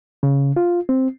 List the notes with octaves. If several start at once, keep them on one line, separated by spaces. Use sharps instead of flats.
C#3
F4
C4